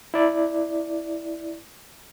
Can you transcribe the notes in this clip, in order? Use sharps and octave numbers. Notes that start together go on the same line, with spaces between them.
E4 D5